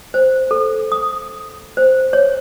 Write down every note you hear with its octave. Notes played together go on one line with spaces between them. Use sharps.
C5
A4
D#6
C5
C#5